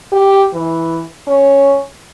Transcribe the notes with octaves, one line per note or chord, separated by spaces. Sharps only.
G4
E3
C#4